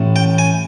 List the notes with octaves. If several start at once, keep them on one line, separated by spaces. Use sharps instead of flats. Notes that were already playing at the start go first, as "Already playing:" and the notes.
Already playing: A1 A2
G5
G#5